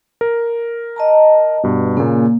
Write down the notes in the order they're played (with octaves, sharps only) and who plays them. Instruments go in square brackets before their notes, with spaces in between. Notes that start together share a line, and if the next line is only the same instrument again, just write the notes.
[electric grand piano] A#4
[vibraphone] D#5 A5 A#5
[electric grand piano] G2 B2
[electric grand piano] A#2 C#3 [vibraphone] A#3